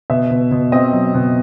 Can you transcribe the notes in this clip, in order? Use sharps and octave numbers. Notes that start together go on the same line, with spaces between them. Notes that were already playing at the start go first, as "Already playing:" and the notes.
B2 E5
B2
B2
C4 D#5
F#3
B2